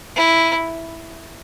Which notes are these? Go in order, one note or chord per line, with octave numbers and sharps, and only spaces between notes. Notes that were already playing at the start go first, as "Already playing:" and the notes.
E4